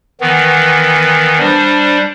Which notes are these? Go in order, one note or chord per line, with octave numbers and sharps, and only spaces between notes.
D#3 E3 B3
G3 D4 C5